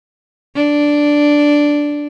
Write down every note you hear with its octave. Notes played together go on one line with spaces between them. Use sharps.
D4